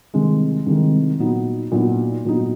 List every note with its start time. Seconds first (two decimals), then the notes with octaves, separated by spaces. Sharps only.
0.14 C2 C3 D#3 G#3
0.66 C2 C3 D#3 G#3
1.19 A#2 F#3 B3 D#4
1.71 A#2 F#3 B3 D#4
2.25 A#2 F#3 B3 D#4